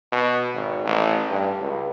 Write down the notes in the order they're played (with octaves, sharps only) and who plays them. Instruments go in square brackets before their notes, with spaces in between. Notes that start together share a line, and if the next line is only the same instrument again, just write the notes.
[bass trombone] B2
G#1
A1
G2
C#2